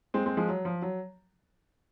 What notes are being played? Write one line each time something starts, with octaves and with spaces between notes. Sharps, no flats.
G#3 C4
G#3 C4
F3 G#3
F#3
F3
F#3